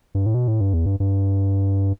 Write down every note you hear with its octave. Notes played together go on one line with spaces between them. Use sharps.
G2
A2
B2
A2
G2
E2
G2
G2